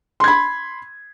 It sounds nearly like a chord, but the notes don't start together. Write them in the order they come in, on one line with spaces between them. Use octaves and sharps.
C6 G#6 B5